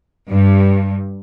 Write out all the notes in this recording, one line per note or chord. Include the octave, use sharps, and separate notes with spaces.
G2